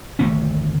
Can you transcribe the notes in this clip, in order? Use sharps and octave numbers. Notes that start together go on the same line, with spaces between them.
G#1 D2 A3 C#4